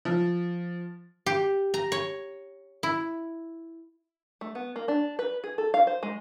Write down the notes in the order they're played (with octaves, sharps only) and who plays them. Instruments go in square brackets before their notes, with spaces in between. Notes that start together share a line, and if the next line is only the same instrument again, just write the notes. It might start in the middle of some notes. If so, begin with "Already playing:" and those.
[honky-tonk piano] F3
[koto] G4
A#5
C#5
E4
[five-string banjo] A3
B3
A#3
D4
B4
G#4
A4
F5
C5
G#3